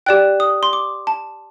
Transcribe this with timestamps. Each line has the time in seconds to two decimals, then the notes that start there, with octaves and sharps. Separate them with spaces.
0.06 G4 D5 G5 F#6
0.40 D#6
0.63 C6
0.73 D6
1.07 A5